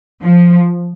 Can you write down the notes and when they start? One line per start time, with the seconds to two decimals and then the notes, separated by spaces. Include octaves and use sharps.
0.23 F3